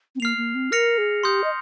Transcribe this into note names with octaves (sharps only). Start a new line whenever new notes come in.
C4
A#3 F6 C7 F7
A#3
C4
A#4 F6 A#6 C#7 F7
G#4
G4 C6 D#6 G6
D#5